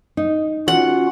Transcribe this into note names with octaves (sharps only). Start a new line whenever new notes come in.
D#4
C#4 F4 F#4 F#5